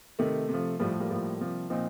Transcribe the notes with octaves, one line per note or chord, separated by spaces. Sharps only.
C3 D#3 A3
C3
F3
A2 F3 G3
G3 A#3
A2 F3
C3 F3
A#2 F3 C4 D#4